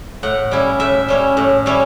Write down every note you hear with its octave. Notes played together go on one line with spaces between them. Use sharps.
A2 F#5
G3 C#4 E4
A2 E5
G3 C#4 E4
A2
G3 C#4 E4